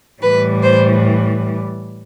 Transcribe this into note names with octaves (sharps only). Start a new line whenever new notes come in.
A2 E3 G3 B4
C5